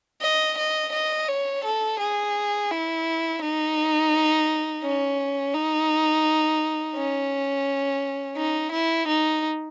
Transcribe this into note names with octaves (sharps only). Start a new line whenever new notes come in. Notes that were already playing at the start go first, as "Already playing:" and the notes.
D#5
D#5
D#5
C#5
A4
G#4
E4
D#4
C#4
D#4
C#4
D#4
E4
D#4